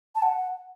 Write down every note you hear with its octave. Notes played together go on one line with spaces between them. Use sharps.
A5
F#5